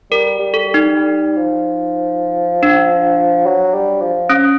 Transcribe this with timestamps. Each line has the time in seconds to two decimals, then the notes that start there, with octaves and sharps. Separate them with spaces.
0.11 G3 A#4
0.39 G3
0.54 A4
0.68 G3
0.74 D#4
0.96 G3
1.38 F3
2.63 D4
3.46 F#3
3.74 G3
4.02 F3
4.30 C#4